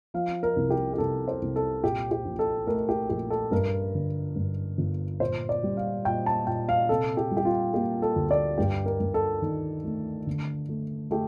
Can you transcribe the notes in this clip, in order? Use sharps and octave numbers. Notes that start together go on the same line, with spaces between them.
F3 F5
A#4
C2
G4
G4
C2 A4
C5
C2
A4
A#2 G4
G4
A#1
A4
A3 A#4
G4
A#1 G4
A4
G2 A#4
D3
G2
G1
A#2 C5
D5
G3
F5
A#2 G5
A5
A#2 G5
F5
C3 A4
G4
G3
G4
F4
A#3 G4
A4
D2
D5
G2 G4
A#4
G2
A4
D#3
A3
D3
A3
A3 G4